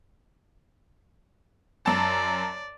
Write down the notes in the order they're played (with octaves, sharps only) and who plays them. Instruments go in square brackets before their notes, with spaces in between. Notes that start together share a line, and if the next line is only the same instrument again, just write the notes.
[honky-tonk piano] F#2 A5 [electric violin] D5